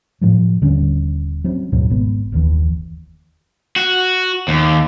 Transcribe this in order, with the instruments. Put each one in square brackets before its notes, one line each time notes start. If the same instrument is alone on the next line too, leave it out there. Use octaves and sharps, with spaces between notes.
[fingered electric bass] A2 F3 F#3
D#1 D3 G3 C#4
F#3 C4 C#4
D2 G#2 B2 F#3
G#1 B3
F#1 D#2 E3
[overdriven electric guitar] F#4
D#2